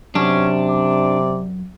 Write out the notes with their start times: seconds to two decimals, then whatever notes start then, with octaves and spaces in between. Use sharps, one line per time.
0.15 F#2 C3 C#4 D4
0.69 D5